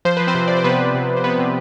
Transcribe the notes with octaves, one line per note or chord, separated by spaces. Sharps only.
F3 C5
F3 B4
C4 C5
C3
C3 D5
C5
C3 B3 B4
C3
C3
C3
C5
C3 B3 B4
C3